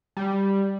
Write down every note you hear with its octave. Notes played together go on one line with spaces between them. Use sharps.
G3